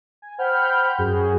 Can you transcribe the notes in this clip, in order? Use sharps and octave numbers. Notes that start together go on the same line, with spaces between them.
G#5
C5 F#5 G5 B5 F6 G6
F#2 F#4 G#4